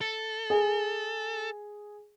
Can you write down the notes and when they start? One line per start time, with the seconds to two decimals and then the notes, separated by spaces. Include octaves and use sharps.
0.01 A4
0.50 G#4